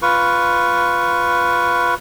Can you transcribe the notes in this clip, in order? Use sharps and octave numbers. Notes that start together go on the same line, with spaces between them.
F4 B4 C#6